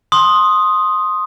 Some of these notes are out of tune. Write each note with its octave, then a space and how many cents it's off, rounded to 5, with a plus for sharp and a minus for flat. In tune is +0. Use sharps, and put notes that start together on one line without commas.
C6 +10 D#6 +0